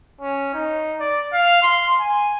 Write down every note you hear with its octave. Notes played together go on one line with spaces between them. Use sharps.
C#4
D#4
D5
F5
C6
G#5